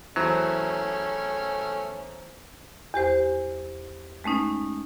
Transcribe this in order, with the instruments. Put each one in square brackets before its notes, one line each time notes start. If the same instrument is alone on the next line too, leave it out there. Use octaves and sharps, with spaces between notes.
[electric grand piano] E2 E4 C5 [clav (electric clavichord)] F#3 [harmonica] A3 C#4
[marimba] E2 G4 C5
G#3 A3 C#4 D#4